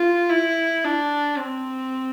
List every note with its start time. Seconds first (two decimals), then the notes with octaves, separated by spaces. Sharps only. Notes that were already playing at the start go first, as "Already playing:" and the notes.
Already playing: F4
0.29 E4
0.84 D4
1.38 C4